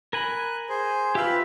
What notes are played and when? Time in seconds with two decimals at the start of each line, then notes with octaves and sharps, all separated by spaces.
0.13 A#4 G#5 B5 F#6
0.69 G#4 C5
1.15 F4 G4 B4 E5